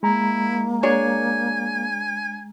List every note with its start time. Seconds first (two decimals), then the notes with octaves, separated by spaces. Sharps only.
0.03 G#3 A#3 E4 A#5
0.83 D4 G#4 C#5 G#5